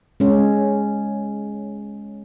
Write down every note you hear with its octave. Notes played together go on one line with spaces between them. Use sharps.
G#3 C#4